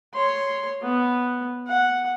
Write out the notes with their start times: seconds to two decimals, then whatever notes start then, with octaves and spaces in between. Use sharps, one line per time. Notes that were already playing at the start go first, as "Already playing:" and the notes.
0.13 C#5 C6
0.82 B3
1.67 F#5